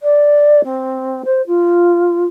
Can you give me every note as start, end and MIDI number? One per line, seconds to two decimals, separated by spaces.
0.02 0.61 74
0.64 1.22 60
1.25 1.42 72
1.47 2.25 65